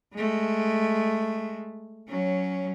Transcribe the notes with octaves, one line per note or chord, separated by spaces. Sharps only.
G#3 A3
F#3 C#4